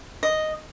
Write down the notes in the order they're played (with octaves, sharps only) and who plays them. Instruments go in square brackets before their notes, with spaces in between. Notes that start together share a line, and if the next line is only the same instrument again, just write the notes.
[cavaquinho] D#5